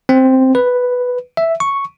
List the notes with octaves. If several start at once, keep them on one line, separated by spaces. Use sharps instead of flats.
C4
B4
E5
C#6